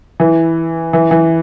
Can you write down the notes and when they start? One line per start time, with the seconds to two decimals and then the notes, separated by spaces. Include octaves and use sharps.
0.20 E3
0.93 E3
1.11 E3